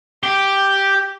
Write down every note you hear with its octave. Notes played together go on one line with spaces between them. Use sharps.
G4 G5